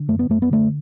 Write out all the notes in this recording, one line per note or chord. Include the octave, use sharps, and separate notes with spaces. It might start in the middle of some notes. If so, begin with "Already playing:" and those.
Already playing: D3
F#2 A3
B3
F#2 A3
B3
D3 A3